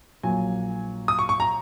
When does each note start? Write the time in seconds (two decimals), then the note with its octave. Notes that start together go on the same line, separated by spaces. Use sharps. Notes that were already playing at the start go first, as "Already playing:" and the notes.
0.23 A#1 A#2 F#3 G#5
1.08 D#6
1.19 C#6
1.29 C#6
1.40 A#5